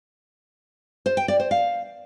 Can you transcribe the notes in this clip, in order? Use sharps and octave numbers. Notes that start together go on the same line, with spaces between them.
C5
G5
D5
C5
F5